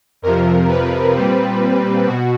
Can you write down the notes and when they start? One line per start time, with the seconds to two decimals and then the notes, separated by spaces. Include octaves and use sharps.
0.22 F2 C3 F3 A#4
0.69 B4
1.15 A#2 G3 C4
2.06 B2 F#4